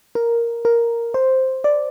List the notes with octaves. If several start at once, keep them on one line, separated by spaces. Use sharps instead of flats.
A#4
A#4
C5
D5